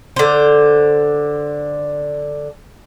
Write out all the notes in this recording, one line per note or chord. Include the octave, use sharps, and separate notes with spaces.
D3 C5